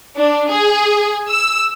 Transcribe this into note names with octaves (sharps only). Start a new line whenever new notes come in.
D4
G#4
E6